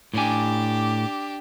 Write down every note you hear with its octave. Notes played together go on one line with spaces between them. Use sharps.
A2 D4 G4 G#5